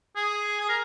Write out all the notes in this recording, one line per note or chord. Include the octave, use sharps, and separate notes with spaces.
G#4
G#4
A#4